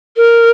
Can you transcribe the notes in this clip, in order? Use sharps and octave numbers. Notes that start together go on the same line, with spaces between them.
A#4